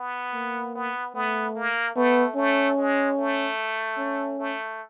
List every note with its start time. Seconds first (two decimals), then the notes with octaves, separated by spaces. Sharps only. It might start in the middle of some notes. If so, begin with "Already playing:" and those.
Already playing: B3
0.34 A#3
0.75 B3
1.14 A3 B3
1.55 A#3
1.95 A3 B3
2.36 A3 C#4
2.77 G#3
3.17 A3
3.98 C#4
4.39 A3